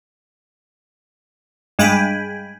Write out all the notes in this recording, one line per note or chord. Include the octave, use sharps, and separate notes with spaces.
G2 G#3 G5 G#5 B5